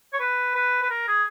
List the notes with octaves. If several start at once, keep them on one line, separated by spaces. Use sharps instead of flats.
C#5
B4
B4
B4
A#4
G#4